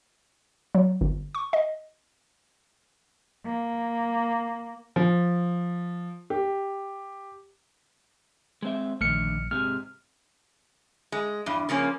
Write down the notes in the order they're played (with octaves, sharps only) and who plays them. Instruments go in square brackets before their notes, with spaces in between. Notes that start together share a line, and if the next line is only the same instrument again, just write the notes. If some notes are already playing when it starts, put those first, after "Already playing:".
[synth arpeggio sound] F#3
G1
C#6
D#5
[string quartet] A#3
[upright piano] F3
G4
[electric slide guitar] G#3 C4 E5
[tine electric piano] A#1 F6 C#7 [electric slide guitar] D3 D#3 A3
[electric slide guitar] G#2 C3 G#3 [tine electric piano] F6
[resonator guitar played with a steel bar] G#3
E2 G2
C#3 F3 A#3 C#4